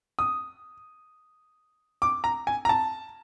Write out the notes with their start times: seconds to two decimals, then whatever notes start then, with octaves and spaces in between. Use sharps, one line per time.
0.19 D#6
2.02 D6
2.24 A#5
2.47 G#5
2.65 A#5
2.69 A5